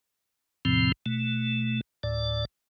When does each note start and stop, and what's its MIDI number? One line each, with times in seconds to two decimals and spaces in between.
0.65 0.92 40
0.65 0.92 45
0.65 0.92 48
0.65 0.92 53
0.65 0.92 60
1.06 1.81 47
1.06 1.81 57
2.03 2.45 38
2.03 2.45 45
2.03 2.45 74